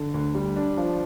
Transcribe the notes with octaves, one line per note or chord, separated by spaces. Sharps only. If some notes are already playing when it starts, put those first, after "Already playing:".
Already playing: D3
D2
G3
D4
F3